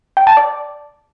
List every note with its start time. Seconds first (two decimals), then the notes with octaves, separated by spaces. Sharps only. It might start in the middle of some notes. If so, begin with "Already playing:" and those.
0.17 G5
0.27 A5
0.37 D5